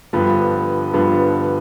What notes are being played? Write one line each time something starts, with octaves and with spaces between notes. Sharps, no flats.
G2 D3 F3 B3
G2 D3 F3 B3